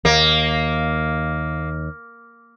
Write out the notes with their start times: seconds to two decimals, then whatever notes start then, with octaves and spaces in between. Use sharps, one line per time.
0.05 D#2 A#3